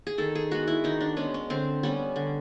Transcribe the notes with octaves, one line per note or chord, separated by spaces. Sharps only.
G#4
D#3 A4
G#4
G#3 B3 F#4
E4
D#3 D#4
D4
G#3 B3 C#4
C#4
D3 C4
G3 B3 C#4
D3